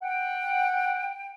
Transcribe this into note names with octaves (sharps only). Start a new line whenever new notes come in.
F#5 G5